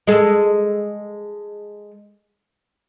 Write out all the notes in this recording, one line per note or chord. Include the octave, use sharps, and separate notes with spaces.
G#3 G#4 A4